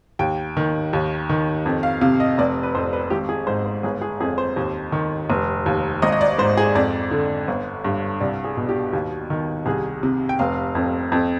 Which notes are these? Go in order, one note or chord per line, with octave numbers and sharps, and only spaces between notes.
D#2 G5
D#3
D#2
D#3
F2
F5
C3 F5
D#5
F1 D5
B4
F2 C5
B4
G#1 G4
G#4
G#2 C5
C5
G1 G#4
G#4
F2 G#4
C5
D#2
D#3
F1
D#2
G#1 D#5
D#5
D5
G#2 C5
G#4
F2 D5
D3
G1
G2
C2 D5
G#4
B2
G4
D#2
D#3
C2 G#4
C3
G5
F1 F5
F2
F2